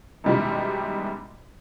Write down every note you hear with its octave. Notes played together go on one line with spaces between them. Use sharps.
F#2 B2 D#3 G3 G#3 E4